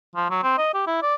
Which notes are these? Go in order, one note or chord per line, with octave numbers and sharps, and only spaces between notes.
F3
F#3
C4
D#5
G4
E4
D5